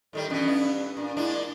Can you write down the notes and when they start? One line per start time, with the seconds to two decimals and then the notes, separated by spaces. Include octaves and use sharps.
0.13 A2 D#3 G3 A4
0.29 G2 B2 E3 C#4
0.47 G2 B3 E4
0.97 A#2 D4
1.17 A#2 G#3 D4 E4